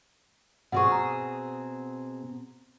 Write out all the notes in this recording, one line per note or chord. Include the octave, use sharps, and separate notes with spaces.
B2 C4 G#4 F#5 C#6
A#5